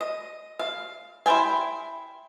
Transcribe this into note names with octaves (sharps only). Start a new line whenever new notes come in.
D#5
F5
E4 C5 F5 G5 G#5